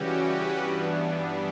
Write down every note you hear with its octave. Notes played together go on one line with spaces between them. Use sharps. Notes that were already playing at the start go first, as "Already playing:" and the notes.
Already playing: C#3 E3 G3 C#4 F#4 G4
B4
G2 E3 G3 B3 D4